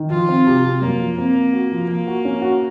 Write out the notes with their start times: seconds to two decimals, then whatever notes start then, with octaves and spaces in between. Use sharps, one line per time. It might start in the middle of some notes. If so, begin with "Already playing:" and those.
Already playing: D#3
0.10 F3 F4
0.29 C4
0.47 C3
0.64 C3
0.82 F#2 A#3
0.99 F3
1.18 A#3 C4
1.35 C4
1.53 F#4
1.72 F3
1.88 F3 A#3
2.07 F#4
2.25 C#4
2.42 F#4